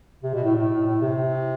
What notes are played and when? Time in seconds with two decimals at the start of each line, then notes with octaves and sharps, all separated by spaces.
0.23 C3
0.34 B2
0.44 A2
0.55 A2
0.86 A2
1.01 C3